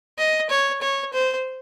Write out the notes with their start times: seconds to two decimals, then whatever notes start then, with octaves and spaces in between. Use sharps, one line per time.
0.18 D#5
0.50 C#5
0.82 C#5
1.13 C5